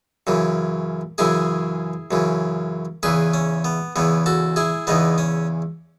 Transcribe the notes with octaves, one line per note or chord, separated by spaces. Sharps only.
F#2 C#3 E3
F#2 C#3 E3 E4 G#4
F#2 C#3 E3
E2 C#3 E3 G#4 B4
C#4
B3
E2 C#3 E3 B3
F#4 A4
E4 G#4
E2 C#3 E3 B3 D#4
C#4